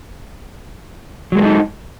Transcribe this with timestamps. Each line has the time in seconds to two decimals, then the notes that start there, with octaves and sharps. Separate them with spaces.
1.32 F#3
1.35 G#3
1.39 A#4
1.42 A4
1.45 D#4